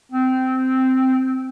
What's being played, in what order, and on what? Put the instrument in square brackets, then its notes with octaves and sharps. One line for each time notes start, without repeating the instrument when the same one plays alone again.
[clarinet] C4